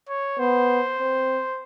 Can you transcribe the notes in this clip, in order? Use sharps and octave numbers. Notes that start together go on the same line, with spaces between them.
C#5
B3 C5
C4